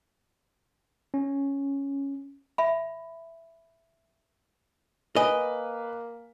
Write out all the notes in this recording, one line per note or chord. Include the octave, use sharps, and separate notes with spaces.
C#4
E5 B5
A#3 B4 D#5 G#5